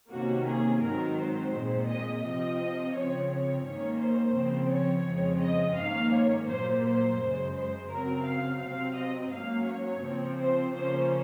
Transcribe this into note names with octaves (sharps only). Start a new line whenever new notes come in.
C3 D#3 A#3 C#4 F#4
G#4
G#2 D#3 F#3 C4 A#4
C5
A#2 G#3 C4
D#5
C3 F3 C4 D#5
C#3 F3 C4 C#5
C#5
G#2 D#3 A#3 C#4 C#5
C5
C#3 F3 C4
C#5
F2 C#3 F3 G#3 C4
D#5
G#2 D#3 A#3 C#4 F5
C#5
A#2 F#3 A#3 C5
C5
F#2 C#3 G#3
C5
C#3 F#3 C4 A#4
F5
C3 F#3 C4 F5
D#5
G#2 F#3 A#3 C#4 F5
C#5
C#3 F3 C4
C5
C#3 F3 A#3 C#4 C5